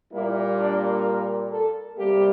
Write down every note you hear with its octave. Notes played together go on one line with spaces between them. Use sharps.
A#2 G3 A#3 E4
D4
A#4
A4
C3 G3 A#3 G4